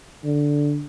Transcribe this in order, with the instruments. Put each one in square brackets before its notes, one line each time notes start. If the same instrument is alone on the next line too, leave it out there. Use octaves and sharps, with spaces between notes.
[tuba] D3